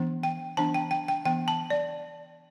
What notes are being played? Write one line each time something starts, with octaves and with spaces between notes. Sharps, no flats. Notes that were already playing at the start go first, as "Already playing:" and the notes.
Already playing: E3 B3 D4
G5
E3 B3 D4 A5
G5
G5
G5
E3 B3 D4 G5
A5
D5